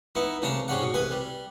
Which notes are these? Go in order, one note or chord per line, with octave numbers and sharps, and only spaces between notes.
B3 D#4 E4
C2 C#3 D4 A5 A#5
G#2 G3 C#4 F#5
B2
C2 B4 G#5 D#6
G3